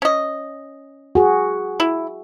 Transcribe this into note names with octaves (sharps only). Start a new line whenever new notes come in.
C#4 D#5
F#4 G#4
E4